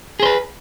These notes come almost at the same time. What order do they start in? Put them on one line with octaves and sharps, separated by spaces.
G#4 C5 B4